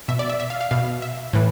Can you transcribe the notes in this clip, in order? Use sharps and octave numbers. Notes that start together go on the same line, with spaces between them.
B2 E5
D5
E5
E5
F5
F5
B2 F5
E5
A2 E3